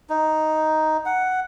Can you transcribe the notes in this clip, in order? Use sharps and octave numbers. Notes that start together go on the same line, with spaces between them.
D#4
F#5